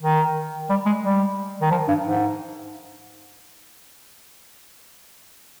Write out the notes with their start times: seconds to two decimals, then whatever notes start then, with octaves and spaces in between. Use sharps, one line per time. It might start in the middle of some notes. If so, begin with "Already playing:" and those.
0.02 D#3
0.70 G3
0.86 G#3
1.03 G3
1.61 D#3
1.71 F3
1.88 G2
2.05 G#2